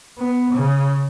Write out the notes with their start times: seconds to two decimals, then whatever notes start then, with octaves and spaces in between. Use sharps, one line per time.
0.18 B3
0.53 C#3